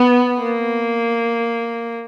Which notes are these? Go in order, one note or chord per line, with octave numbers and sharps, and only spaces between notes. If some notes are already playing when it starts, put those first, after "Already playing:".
Already playing: B3
A#3